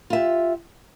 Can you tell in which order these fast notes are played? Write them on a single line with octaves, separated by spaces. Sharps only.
F4 E5 G4